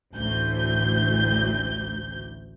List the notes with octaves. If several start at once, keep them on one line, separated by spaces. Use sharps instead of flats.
A1 D2 G6